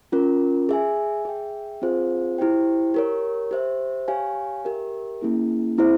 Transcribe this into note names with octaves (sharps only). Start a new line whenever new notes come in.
C#4 F4 A#4
G#4 E5 G#5
G#4 E5 G5
C4 F4 G#4 C5 F5
E4 G4 C5 G5
G4 A#4 C#5
G4 C5 E5
G4 C#5 F5 G#5
G4 A#4 E5
A#3 C#4 E4 G#4
C4 E4 G#4 C5 E5